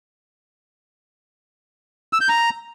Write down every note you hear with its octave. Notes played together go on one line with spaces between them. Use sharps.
E6
G6
A#5